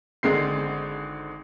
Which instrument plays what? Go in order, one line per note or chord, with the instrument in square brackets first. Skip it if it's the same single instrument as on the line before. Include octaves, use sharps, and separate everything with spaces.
[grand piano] G#1 D3 G#3 C4 C7